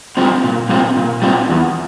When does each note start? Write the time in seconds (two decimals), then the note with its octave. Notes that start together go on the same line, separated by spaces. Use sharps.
0.17 G3 C4 F4
0.44 A#2
0.69 G3 C4 F4
0.97 A#2
1.22 G3 C4 F4
1.50 E2